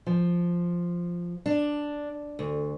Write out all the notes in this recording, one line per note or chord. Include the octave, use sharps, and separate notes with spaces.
F3
D4
D2